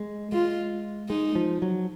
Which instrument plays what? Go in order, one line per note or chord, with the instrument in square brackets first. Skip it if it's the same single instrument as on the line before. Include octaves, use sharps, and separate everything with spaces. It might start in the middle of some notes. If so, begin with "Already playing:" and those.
Already playing: [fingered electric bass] G#3
[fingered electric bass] G#3 [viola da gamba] F4
[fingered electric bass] G#3 [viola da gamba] D#4
[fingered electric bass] F3
F#3